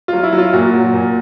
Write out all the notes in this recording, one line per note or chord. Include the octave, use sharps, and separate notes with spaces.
F#3 F4
E4
F#3
F4
A#2 F#4
F#3
A#2